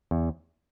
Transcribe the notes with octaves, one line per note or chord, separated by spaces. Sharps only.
E2